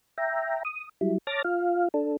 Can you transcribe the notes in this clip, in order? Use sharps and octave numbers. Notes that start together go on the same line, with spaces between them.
E5 G5 A#5
D#6
F#3 G3 E4
C#5 A5 D6 F6 A6 A#6
F4 F5
D4 A4